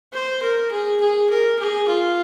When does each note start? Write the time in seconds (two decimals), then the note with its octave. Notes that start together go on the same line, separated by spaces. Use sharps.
0.13 C5
0.42 A#4
0.71 G#4
1.00 G#4
1.29 A#4
1.58 G#4
1.88 F4